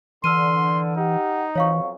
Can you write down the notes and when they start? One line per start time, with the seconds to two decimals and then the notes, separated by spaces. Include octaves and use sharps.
0.24 D3 E3 C6 E6 F6 D#7
0.96 D#4 G4 F#5
1.55 B1 F2 E3 F#3 C#5 F5 C#6